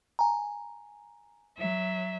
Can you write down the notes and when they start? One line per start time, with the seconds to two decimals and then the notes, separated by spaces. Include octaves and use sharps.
0.19 G#5 A#5
1.57 F#3 E5